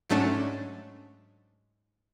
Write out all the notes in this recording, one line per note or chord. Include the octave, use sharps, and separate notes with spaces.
G#2 F#3 A3 C#4 D4